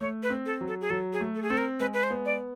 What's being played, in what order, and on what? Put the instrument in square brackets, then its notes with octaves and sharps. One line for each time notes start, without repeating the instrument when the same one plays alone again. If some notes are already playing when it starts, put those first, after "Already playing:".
[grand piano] A3 [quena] C#5
[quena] B4
[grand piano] C4
[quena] A4
[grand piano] F#3
[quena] A4
G#4
[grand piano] F#3 [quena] A4
[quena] G#4
[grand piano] A3
[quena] A4
G#4
[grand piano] C4 [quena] A4
[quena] A#4
[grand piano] G#3 [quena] B4
[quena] B4
C5
[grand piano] B3
[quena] D5